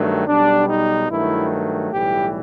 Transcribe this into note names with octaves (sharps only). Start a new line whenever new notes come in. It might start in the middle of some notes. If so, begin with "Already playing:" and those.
Already playing: G2 D#3 F#3 A3
B1 B2 G3 D4
D#4
G2 D#3 F#3 A3 E4
B1 A2 E3 G3 G4